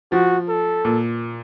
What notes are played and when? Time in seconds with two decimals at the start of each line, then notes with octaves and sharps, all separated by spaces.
0.12 F3 F#4
0.49 A4
0.85 A#2